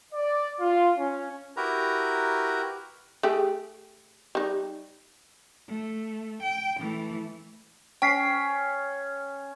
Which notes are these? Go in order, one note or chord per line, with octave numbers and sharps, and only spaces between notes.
D5
F4
C#4
E4 F#4 G4 A#4 B4 A#5
A3 G4 G#4
G3 D#4
A3
G5
E3 A3
C#4 G5 B6 C7